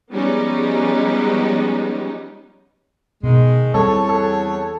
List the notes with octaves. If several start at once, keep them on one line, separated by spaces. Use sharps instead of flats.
F3 G3 G#3 B3 C#4 D#4
B2 D#3 G#3
E2 G3 C4 A4 C#5
A4